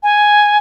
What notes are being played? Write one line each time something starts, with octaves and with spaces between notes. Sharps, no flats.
G#5